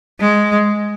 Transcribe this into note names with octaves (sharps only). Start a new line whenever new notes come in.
G#3